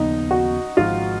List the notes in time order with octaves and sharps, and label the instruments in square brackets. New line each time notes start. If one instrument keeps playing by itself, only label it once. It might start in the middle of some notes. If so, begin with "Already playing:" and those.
Already playing: [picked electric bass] D#2 C#3 F3 B3 [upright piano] D#4
[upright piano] F#4
[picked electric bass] G#1 G#2 F3 [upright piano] F4